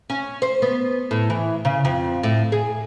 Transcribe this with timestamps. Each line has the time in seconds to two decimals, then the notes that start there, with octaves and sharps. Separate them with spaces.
0.10 C#4
0.42 C5
0.62 B3
1.11 A2
1.30 E3
1.65 C#3
1.85 F2
2.23 A2
2.52 G#4